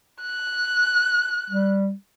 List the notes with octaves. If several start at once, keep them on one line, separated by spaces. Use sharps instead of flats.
F#6
G3